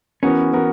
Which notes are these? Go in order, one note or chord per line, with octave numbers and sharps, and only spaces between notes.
E3 B3 C#4 F#4 A#4
E3 B3 F#4 A#4